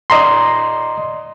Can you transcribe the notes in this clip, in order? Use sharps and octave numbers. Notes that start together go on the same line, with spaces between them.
D5 D#5 A#5 C6